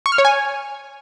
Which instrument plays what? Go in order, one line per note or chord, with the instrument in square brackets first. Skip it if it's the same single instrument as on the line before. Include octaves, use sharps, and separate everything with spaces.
[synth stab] C#6
F6
C#5
G#5